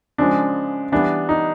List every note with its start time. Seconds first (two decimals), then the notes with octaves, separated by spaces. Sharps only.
0.18 C#3 F3 G#3 D4
0.92 E3 G3 B3 D4
1.29 D#4